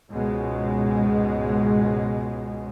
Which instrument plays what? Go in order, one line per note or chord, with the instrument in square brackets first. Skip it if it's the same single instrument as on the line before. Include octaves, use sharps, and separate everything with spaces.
[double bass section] C#2 G#2 B2 G#3